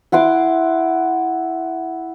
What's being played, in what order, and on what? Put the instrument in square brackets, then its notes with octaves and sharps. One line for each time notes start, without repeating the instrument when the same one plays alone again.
[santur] E4 F#5 C6 D6